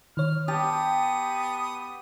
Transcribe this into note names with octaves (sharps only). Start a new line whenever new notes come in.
D#3 C#5 F6
B3 G4 G5 A5 D#6